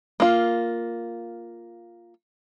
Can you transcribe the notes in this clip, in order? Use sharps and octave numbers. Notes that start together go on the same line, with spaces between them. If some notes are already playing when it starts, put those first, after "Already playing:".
A#3 F4